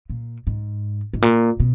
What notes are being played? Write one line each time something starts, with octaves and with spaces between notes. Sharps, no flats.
A#2
G#2
G#2
A#2
B2